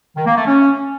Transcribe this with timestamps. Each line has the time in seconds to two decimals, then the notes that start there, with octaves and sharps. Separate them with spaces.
0.16 D#3
0.26 A#3
0.36 A3
0.46 C#4